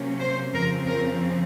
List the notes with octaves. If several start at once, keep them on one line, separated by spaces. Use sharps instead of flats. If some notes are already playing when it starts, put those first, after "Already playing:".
Already playing: C3 F#3 A#3 C#4
C5
F2 C#3 F3 C4 A#4
A#4